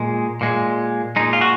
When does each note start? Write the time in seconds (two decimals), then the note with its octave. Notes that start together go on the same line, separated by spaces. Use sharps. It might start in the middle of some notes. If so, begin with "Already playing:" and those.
Already playing: A#2 G#3
0.41 A#2 G#3
1.16 G#3 D#4
1.20 A#2
1.33 F4
1.41 F#4